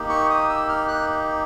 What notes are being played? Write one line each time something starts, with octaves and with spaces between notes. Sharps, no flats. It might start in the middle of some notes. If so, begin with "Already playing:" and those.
Already playing: A#3 D#4 G4
C#6
D#6
E6
F6
F#6